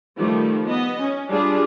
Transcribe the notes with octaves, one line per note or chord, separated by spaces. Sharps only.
D#3 F3 G3 A3 F4
B3 D#5
C#4
G3 D4 F4 G#4